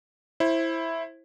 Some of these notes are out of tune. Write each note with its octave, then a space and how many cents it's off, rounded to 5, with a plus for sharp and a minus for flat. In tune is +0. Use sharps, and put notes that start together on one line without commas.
E4 +0 C5 +25